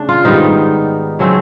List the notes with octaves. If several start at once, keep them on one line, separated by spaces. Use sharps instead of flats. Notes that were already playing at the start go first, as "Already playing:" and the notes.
Already playing: C#3 A3 D4
F4
G#2 D#3 G3 B3 D#4
C#3 F#3 A3 C4